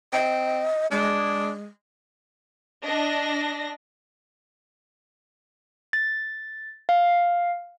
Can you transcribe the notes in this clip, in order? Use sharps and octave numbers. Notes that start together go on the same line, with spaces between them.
C4 D#5
G#3 D4
D4 D#5 A#6
A6
F5